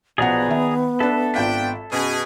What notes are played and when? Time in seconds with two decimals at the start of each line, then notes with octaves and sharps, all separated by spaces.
0.18 B1 F3 B3 G#4 D5 F#5 A#5
0.48 D#3 E5
1.00 D4 A4 B4 E5
1.34 G#1 D4 F4 G5 B6
1.92 F#2 B2 G#4